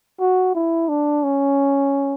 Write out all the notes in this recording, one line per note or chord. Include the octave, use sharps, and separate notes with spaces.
F#4
E4
D4
C#4